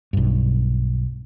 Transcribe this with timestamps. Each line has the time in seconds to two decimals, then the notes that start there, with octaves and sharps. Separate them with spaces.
0.13 B1 G2